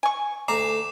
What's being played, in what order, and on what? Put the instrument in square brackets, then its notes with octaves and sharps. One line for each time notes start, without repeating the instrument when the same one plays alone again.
[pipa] G#5 C#6
[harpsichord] D2 A3 D5 [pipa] A#5 [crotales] D6 C7 E7